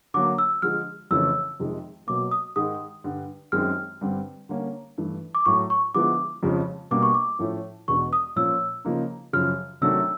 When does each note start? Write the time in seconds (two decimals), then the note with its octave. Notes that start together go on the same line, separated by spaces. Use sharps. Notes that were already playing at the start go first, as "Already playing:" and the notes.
0.14 D3 F#3 A#3 D6
0.38 E6
0.62 D3 F3 G#3 F6
1.11 F2 C#3 E3 A3 C#4 E6
1.60 F2 C3 D#3 G#3
2.07 B2 F#3 A#3 D6
2.31 D#6
2.56 G#2 D#3 G#3 D#6
3.04 G2 D3 G3
3.52 F#2 D#3 G#3 C4 F6
4.01 G2 D3 G3 C4
4.49 D3 G3 A#3 C#4
4.98 G2 E3 A3
5.35 D6
5.45 A2 F#3 A3 C#6
5.70 C#6
5.94 D3 F3 G#3 B3 E4 D6
6.43 F2 C#3 F3 G#3 C#4
6.91 B2 G3 A#3 D4 D6
7.03 C#6
7.14 D6
7.39 A2 F3 A3 C#4 E4
7.88 E2 B2 G#3 B3 D4 C#6
8.13 D#6
8.36 A#2 F3 A#3 C#4 E6
8.85 C#3 F3 A#3 D#4
9.33 F#2 C#3 F3 F6
9.81 C3 D#3 F#3 A3 D4 E6